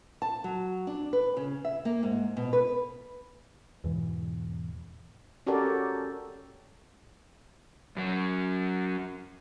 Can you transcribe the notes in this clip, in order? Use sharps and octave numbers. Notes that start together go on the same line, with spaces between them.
A5
F#3
D4
B4
C#3
E5
A#3
G#2
B2
B4
E2 G#2 B2 E3
C#4 F#4 G4 A4 A#4 D5
F#2 F#3